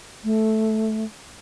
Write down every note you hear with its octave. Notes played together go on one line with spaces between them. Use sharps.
A3